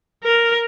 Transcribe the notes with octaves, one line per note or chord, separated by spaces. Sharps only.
A#4